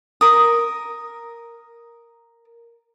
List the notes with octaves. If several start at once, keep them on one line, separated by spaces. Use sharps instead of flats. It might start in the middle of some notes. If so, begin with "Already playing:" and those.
A#4 D#6